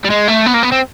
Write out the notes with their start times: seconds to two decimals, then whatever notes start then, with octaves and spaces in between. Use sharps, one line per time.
0.05 G3
0.10 G#3
0.28 A3
0.46 B3
0.54 A#3
0.63 B3
0.72 C4